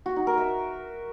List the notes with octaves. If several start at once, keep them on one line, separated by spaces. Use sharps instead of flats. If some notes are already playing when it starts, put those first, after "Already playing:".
F#4
D#4
A#4
E5